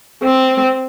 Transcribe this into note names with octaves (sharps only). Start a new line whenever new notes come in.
C4